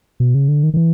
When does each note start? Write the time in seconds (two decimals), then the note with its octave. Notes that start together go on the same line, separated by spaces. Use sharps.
0.20 B2
0.35 C#3
0.48 D3
0.63 D#3
0.74 D#3
0.77 E3